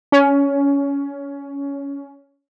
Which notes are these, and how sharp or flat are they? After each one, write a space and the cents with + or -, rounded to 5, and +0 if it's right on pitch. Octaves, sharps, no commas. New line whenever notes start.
C#4 +15